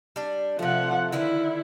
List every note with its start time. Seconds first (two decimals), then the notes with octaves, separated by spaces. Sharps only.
0.16 G3 D4
0.59 C3 F3 A3 F#5
1.12 D3 D#3 E4 B4